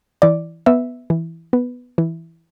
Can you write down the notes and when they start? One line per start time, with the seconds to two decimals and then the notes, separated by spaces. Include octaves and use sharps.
0.22 E3 D5
0.66 B3 E5
1.10 E3
1.53 B3
1.98 E3